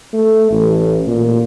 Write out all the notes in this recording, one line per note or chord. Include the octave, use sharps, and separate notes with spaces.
A3
A1
A#2